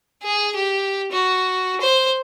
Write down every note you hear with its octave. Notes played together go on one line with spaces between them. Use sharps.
G#4
G4
F#4
C5